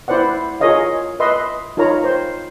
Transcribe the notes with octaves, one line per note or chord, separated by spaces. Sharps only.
E4 B4 C5 D5 F#5
F4 G#4 A#4 C#5 D#5 F5
B4 D#5 E5 C6
D#4 F4 A#4 C#5 A#5 B5
C5